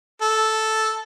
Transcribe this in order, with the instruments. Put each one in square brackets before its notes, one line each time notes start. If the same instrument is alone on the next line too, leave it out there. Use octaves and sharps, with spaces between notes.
[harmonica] A4